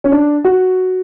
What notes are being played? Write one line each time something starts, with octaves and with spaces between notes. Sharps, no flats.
C#4
D4
F#4